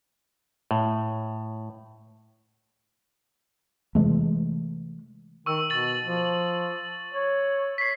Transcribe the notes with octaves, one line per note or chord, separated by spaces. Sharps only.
A2
C3 E3 G#3 A3
D#3 C#6 E6
B2 A6 F#7
F3
C#5
C#5 B6 C7